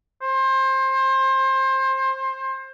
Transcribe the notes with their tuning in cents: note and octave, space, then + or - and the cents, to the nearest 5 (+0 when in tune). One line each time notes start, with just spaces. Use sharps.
C5 +25